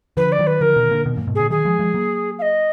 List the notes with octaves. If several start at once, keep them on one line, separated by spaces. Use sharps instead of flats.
D3 F3 B4
D5
D#3 F#3
B4
D3 F3 A#4
B2 D#3
A#2 D3
B2 D#3
F#2 A#2
G#2 B2
A#2 D3 G#4
D#3 F#3 G#4
F3 G#3
F3 G#3
F#3 A#3
F5
D#5